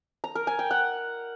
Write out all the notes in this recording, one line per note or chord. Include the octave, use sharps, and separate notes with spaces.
A#5
A#4
G#5
G5
F#5